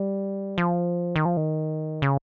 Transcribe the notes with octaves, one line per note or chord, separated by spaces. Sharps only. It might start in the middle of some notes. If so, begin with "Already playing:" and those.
Already playing: G3
F3
D#3
F3
D#3
C#3